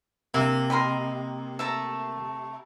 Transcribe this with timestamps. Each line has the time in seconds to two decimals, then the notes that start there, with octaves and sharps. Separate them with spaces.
0.34 C3 A#3
0.70 G4 A#4 D#5 B5 C6
1.59 A3 E5 A5 A#5